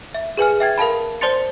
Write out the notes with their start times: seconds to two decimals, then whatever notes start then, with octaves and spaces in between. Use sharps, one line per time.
0.14 E5
0.37 G#4 B4 G#5 F6
0.60 E5 G5 G#6 A6
0.78 A#4 F5 A5 B5
1.21 C5 D5 A5 C6 A6 C#7